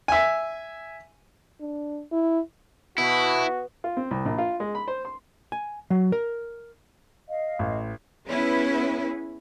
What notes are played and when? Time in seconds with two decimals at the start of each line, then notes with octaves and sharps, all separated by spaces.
0.08 E5 G#5
1.61 D4
2.12 E4
2.98 B2 E4 F#4
3.84 F4
3.97 C4
4.11 C2
4.25 A#1
4.38 F4
4.60 G#3
4.75 B5
4.88 C5
5.05 C6
5.52 G#5
5.90 F#3
6.12 A#4
7.28 D#5 F5
7.59 A1
8.27 B3 C#4 E4 G#4 B4